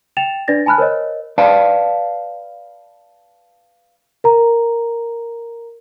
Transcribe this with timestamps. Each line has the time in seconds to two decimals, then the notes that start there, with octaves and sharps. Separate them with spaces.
0.17 G5 A6 E7 F7
0.48 D4 B4 D5 A6 A#6
0.66 G#5 A5 B5 F6 F#6
0.78 A#4 C5 C#5 D#5
1.38 B4 D5 F5 A5
4.24 A#4 A#5